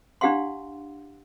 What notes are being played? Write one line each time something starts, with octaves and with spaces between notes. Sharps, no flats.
D4 E4 G4 F5 F#5 C6